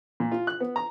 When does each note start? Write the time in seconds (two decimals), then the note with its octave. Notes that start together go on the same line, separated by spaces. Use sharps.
0.20 A#2
0.32 F4
0.47 F#6
0.60 B3
0.76 A#5